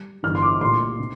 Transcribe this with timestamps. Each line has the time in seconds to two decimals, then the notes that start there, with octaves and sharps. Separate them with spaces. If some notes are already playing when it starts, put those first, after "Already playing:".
Already playing: G3
0.23 G1 G2 E3 F6
0.35 C6
0.42 D6
0.61 C2 A#2 A3 C6
0.99 C3